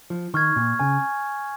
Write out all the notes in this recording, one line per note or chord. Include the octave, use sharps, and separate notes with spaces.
F3
D#3 C#6 F6 G#6
A#2
C#3 G#5